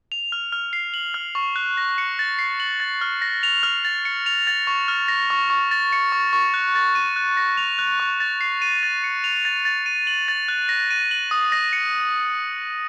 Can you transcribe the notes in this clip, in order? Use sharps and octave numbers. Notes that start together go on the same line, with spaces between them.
F7
F6
F6
C7
F#7
F6
C#6
F#6
A#6
C#7
A6
C7
F#7
A6
F6
A#6
F7
F6
A6
C#7
F7
A6
C#6
F6
A#6
C#6
C#6
A6
C#7
C#6
C#6
F#6
A6
D#7
F#6
A#6
F7
F#6
C#6
A6
C7
D#7
A6
C#7
F7
A6
A6
D#7
F#7
A6
F#6
A#6
D#7
F#7
D#6
A#6
C#7